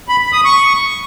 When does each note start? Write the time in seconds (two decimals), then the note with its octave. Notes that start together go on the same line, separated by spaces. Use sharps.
0.09 B5
0.21 B5
0.33 D#6
0.45 C#6